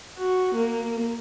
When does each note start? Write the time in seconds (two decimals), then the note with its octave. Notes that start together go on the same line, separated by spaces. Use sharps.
0.17 F#4
0.55 A#3